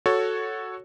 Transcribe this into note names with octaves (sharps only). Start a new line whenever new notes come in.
F#4 A4 C#5